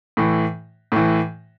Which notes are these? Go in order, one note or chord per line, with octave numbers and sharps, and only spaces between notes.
A2 E3
A2 E3